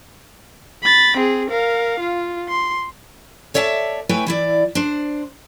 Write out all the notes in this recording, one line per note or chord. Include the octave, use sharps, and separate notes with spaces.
B5 A6
C4 G#4
A#4 F5
F4
C6
A4 C#5 D5 E5 F#5 A5
A3 E4 B4 C#5 G5 G#5
E3 E4 D5
D4 C5